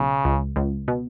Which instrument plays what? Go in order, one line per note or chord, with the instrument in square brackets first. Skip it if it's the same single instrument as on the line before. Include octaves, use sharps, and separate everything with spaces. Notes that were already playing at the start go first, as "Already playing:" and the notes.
Already playing: [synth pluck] B1 [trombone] C#3
[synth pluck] C#2
C#2
B2